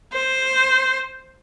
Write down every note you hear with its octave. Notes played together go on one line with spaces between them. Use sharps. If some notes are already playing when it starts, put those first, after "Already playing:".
C5